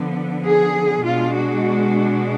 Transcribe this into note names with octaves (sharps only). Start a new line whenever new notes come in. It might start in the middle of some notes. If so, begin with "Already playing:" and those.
Already playing: D3 F3 B3
G#4
B2 G#3 D4 F4
F#4